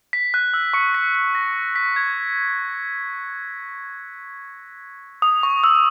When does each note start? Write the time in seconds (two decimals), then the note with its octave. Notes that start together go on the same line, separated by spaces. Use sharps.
0.13 B6
0.34 F#6
0.54 E6
0.73 C#6 C#7
0.94 B6
1.15 B6
1.35 A#6
1.76 B6
1.96 G#6
5.22 D#6
5.43 C#6
5.64 E6